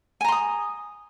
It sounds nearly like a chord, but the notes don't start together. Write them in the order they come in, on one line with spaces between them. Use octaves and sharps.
G#5 A#5 C6 D#6